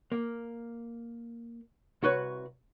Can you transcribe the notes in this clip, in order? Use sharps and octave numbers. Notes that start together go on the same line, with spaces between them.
A#3
C2 F#4 B4 C#5